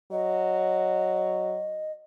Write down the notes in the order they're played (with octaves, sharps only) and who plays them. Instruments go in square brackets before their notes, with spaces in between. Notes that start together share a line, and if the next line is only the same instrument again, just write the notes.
[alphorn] F#3 [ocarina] D#5